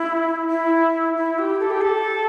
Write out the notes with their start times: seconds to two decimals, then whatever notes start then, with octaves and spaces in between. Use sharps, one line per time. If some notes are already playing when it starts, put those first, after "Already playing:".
Already playing: E4
0.50 E4
1.17 E4
1.39 G4
1.60 A4
1.70 G4
1.81 A4